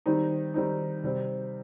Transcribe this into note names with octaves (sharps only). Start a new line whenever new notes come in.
D#3 G3 C4 D#4
D#3 G3 C4 D#4
C3 G3 C4